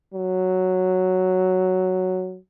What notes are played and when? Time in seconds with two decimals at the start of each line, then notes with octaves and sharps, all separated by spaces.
0.14 F#3